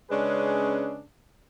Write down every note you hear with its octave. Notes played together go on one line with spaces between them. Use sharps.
C#3 G#3 C#4 D4 G#4 B4